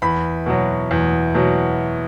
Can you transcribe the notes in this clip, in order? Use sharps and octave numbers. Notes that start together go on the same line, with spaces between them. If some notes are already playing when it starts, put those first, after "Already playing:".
E2 B5
B2 F#3
E2
B2 F#3